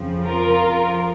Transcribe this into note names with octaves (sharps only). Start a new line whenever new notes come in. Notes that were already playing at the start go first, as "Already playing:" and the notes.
Already playing: F2 C#3 F3
F4 A#4
F2 F3